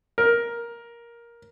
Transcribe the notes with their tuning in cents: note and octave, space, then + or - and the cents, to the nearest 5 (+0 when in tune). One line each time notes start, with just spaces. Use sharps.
A#4 +10